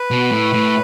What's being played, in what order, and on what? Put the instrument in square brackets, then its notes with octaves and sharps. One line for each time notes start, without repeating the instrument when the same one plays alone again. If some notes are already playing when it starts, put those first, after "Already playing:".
Already playing: [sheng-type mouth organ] B4
[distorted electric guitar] B2
A2
A2